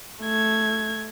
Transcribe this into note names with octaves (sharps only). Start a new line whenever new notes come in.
A3 G#6